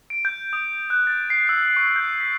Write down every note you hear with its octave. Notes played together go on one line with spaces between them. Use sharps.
D7
G6
D#6
F#6
A6
C7
E6
C#6
G6
B6